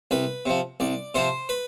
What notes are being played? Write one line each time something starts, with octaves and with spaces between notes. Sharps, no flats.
C2 B4
C3 F3
C2 D5
C3 F3 C5
B4